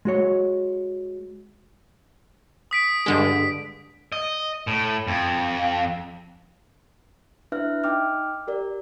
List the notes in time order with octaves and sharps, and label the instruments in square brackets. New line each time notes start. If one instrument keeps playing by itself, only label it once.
[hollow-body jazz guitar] G#3 F#4 C#5
[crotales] D#6 B6 D7
[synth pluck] G2 D3 G#3
[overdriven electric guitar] D#5
A2
F2
[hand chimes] D4 E4 B4 E5 F6 F#6
D#4 G5 D6 F6
G4 A#4 D5